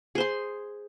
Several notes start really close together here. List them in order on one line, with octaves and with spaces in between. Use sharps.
G#4 C5 C6